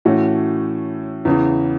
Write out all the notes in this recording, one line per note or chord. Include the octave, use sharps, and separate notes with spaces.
A2 E3 A3 C#4 F#4
E2 C#3 E3